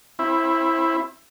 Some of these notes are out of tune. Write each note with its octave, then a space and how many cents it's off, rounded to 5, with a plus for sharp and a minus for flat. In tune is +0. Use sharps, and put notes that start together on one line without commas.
C4 +35 E4 +0